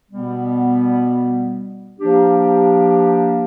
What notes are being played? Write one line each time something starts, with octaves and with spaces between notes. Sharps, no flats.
B2 G3 B3
F3 A#3 D4 G4